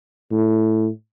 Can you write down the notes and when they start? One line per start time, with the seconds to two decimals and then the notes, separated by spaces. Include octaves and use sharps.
0.31 A2